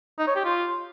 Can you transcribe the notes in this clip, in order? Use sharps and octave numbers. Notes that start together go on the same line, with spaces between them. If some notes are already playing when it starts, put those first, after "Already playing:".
D#4
C#5
G4
F4